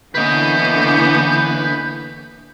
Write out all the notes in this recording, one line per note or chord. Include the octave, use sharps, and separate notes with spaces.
D3 E3 A#3 B3 C#4 B4 D#5 G6